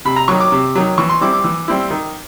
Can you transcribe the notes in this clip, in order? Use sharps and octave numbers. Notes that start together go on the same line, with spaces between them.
C3 B5
A#5
D#3 F#3 C#6
D6
C3
D#3 F#3
E3 C#6
C6
G3 C4 E4 D6
D6
E3
G3 C4 E4
D#3